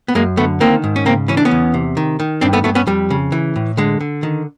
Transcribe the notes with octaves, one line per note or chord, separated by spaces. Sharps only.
B3
F#2 G#3 A#3
D3 A3 B3
D#3 A#3 C4
G#2
C#4
C#3 A#3 C4
E3 C#4
D4
B3 C#4
E2
C3
D#3
D#3
G2 C4 D4
A3 B3
G2 A3 B3
B3 C#4
F2 G3
C#3
E3
A2
D3 G#3
D3
D#3